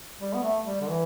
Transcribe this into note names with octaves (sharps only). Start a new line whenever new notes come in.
G3
B3
A3
G3
D3
E3